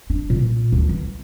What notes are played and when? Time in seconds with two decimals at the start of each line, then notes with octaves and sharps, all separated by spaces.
0.10 D4
0.30 A#2
0.72 D2
0.89 E3